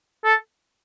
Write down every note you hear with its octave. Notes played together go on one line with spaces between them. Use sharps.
A4